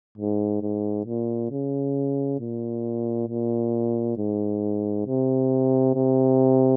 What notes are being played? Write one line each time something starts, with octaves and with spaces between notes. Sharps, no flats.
G#2
G#2
A#2
C#3
A#2
A#2
G#2
C3
C3